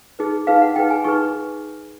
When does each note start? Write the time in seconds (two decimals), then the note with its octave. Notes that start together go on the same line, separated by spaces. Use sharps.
0.19 D#4 G#4 B4
0.47 D#4 G#4 B4 F5
0.62 F#5
0.76 D#4 G#4 B4 G5
0.90 G#5
1.04 D#4 G#4 B4 C#6